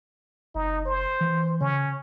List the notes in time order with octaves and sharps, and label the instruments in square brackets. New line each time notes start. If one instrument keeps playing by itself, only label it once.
[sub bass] F#1 [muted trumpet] D#4
[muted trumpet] C5
[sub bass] E3
[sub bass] C#3 [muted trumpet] C#4